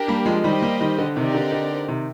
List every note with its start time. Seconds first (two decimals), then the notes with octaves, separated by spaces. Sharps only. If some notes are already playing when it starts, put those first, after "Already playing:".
Already playing: D4 G4 A#4
0.08 G3 A#3
0.25 F3 G#3
0.44 D#3 G3 G4 C5 D#5
0.62 G3 A#3
0.80 D#3 G3
0.99 D3
1.16 C3 D#3 C4 D#4 G4 A#4 D5
1.35 D3
1.52 D3
1.88 C3 D#3